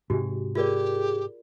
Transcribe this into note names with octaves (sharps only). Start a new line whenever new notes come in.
G#2 C3 G#3 F#4 G4
F4 G4 G#4 A#4 D5